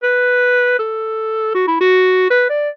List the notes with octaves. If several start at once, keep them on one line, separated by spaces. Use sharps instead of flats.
B4
A4
F#4
E4
F#4
B4
D5